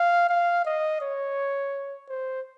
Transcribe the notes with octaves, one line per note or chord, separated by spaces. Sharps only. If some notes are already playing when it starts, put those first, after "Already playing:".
Already playing: F5
F5
D#5
C#5
C5